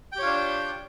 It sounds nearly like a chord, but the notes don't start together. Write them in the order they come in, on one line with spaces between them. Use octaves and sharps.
G5 G4 C#5 F4 D4